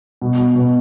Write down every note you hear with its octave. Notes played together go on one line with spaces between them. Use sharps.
B2
B2
B2